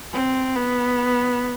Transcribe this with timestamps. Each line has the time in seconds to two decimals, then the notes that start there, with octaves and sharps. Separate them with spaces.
0.13 C4
0.56 B3